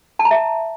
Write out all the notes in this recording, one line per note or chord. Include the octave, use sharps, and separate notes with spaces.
A5
A#5
E5